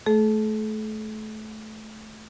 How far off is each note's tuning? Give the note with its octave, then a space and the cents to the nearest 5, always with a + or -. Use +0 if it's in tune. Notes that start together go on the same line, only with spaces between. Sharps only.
A3 -20 A4 -45